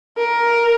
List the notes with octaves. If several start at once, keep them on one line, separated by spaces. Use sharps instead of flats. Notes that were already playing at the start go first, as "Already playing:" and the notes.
A#4